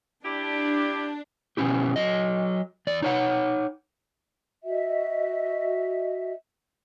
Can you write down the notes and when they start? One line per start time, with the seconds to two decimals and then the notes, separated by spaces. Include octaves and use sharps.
0.25 D4 E4 G4
1.57 B2 D3 C#4 E4 G4
1.96 F#3 D#5
2.87 E2 D5
3.02 D#4 C#5 F#5
4.64 F#4 D#5 E5